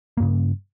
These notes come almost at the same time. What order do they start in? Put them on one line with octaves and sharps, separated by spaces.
A#3 G2 C#3